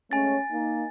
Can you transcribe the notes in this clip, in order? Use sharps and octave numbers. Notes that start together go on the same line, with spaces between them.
G#3 A3 C#4 G#5 A6
A#3 D#4